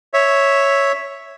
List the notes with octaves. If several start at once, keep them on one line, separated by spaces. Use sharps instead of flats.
C#5 E5